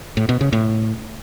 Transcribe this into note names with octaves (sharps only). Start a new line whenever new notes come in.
A2
B2
C#3
A2